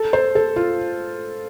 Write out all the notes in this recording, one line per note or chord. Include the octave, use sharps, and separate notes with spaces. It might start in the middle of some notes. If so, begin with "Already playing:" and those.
Already playing: A4
C5
A4
F4